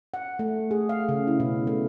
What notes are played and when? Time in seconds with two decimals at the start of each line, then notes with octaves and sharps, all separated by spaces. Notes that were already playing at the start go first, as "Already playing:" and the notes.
0.14 F#5
0.39 A3
0.71 G#4
0.89 F5
1.09 C#3
1.27 E4
1.40 B2
1.67 A3